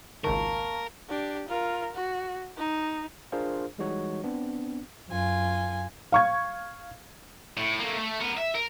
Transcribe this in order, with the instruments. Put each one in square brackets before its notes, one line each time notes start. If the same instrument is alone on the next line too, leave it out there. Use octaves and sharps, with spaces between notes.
[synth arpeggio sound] G#1 C#2 D#3 [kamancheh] A#3 [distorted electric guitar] A#4 [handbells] A5 C#6
[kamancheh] D4 G4
F4 A#4
F#4
D#4
[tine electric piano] D4 F4 G#4 A#4 C5 F5
E3 G3 G#3 D#4 F#4 C#5
B3 C4 D4
[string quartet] F#2 F4 G#5
[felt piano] F5 C#6 G#6
[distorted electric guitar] A2
A3 A#3
A3
B3 A#4
E5
A#4